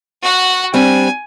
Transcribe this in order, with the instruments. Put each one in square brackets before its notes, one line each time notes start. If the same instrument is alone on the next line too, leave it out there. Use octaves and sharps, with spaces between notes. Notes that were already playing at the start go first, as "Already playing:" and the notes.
[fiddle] F#4 F#5
[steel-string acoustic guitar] G3 C4 D4 [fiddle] G#5